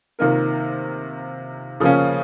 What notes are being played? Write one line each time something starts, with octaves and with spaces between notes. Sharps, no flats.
C3 D#3 A#3 F4 A#4
C#3 F3 A#3 C#4